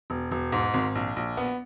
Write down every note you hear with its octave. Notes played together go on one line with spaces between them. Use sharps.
E1
E1
G#2
G#1
A#1
A#1
B3